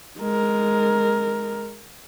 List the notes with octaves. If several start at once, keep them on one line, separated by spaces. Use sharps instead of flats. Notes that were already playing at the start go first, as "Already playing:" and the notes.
G#3 A#4